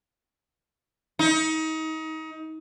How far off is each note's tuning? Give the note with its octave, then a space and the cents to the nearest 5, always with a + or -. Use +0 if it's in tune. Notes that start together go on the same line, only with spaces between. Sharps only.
D#4 +30